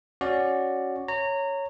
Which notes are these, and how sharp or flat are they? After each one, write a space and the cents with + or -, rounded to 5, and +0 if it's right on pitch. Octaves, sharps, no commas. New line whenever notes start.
C#4 +0 F#4 +0 D5 +5
C#5 +0 A#5 -20